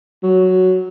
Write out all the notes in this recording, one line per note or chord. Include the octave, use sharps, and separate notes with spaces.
F#3